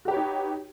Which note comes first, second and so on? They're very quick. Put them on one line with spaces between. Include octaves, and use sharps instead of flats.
F#4 G4 B4 C#5 D#4